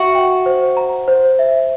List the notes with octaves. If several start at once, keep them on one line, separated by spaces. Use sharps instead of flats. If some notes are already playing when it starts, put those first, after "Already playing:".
Already playing: F#4 E5
G5
C5
A#5
C5
E5